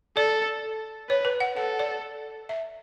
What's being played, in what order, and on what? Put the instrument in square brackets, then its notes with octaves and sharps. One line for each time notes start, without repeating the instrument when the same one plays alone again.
[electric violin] A4 [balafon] D5
[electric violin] B4 [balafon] C#5
[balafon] B4
F#5
[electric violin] A4 [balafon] F#5
[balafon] D5
E5